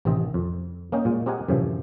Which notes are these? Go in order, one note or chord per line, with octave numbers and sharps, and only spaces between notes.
A1 C3 D#3 C4 D#5
F2
A#3 C#4 D#5 G5
A#2 G#3
C4 G4 A#4 D#5 F#5 G#5
F#2 A2 C3 E3 F3